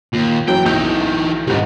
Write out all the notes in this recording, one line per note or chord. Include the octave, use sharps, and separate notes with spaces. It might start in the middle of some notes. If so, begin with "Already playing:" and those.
D#2 A#2
F#2 E3 F#3 G5
B1 E3 D#4 E4 G6
C#2 G#2 B2 D#3 G3